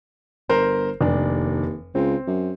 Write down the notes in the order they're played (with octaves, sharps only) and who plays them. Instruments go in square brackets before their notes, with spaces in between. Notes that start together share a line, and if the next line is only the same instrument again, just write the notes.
[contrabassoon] G1 [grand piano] A#4 C5
[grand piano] F1 D4 [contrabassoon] D#2
[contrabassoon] C#2 [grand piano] C4
[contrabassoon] F#2